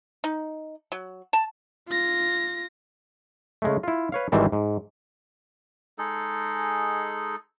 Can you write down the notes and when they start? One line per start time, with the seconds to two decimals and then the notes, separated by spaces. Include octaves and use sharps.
0.24 D#4
0.92 F#3
1.33 A5
1.89 F4 A#6
3.62 C#3 G#3 A3
3.83 E4 F4
4.12 B4 C#5 F5
4.32 G#1 D#3 E3 G3 C4 A5
4.52 G#2
5.98 G#3 D#4 G#4 A4